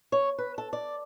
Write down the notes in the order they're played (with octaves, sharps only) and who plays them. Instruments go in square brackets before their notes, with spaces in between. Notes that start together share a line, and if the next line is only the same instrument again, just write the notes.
[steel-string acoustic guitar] C#5
B4
A4
D5